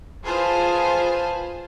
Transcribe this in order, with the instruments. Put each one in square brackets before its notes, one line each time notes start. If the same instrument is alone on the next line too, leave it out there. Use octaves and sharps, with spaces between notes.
[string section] F4 G#4 B4 C5 G#5 A5